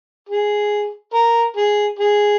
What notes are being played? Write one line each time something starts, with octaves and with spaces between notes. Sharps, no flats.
G#4
A#4
G#4
G#4